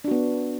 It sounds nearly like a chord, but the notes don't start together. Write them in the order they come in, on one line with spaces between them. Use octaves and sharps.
D4 F#4 B3